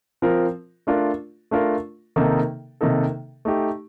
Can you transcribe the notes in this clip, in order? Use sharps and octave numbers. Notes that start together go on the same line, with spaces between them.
F3 C4 F4 A#4
A3 D4 F4 A#4
A3 D4 F4 A#4
C3 D#3 A#3 D#4 A4
C3 D#3 A#3 D#4 A4
A3 D#4 G4